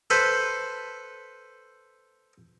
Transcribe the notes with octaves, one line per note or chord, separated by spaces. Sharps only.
A4 B4 C5